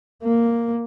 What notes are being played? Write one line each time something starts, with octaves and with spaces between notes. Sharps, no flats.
A#3